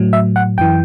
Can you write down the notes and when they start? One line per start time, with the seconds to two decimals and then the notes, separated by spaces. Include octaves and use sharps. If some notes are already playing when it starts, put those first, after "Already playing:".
Already playing: A2 F#3
0.13 E5
0.36 F#5
0.58 F#2 E3 G5